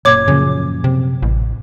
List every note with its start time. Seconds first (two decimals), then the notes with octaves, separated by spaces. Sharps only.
0.05 F#1 A#2 C#5 D6 G#6
0.28 F#2 A#2 C#3 F3
0.84 C3
1.22 A1